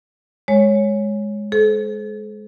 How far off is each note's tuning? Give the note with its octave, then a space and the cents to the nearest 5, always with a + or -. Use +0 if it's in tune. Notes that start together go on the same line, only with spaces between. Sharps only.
G#3 +0 C#5 -5
A4 -45 C5 +0